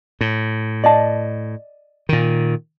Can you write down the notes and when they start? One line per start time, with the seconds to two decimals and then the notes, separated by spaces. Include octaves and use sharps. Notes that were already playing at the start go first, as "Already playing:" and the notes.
0.21 A2
0.84 D5 D#5 A5
2.09 A#2 D#3